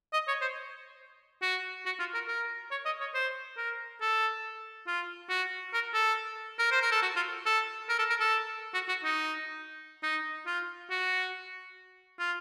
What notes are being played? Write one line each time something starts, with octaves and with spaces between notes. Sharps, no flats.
D#5
C#5
C5
F#4
F#4
F4
A#4
A#4
C#5
D#5
C#5
C5
A#4
A4
F4
F#4
A#4
A4
A#4
C5
A#4
A4
F#4
F4
A4
A#4
A4
A#4
A4
F#4
F#4
D#4
D#4
F4
F#4
F4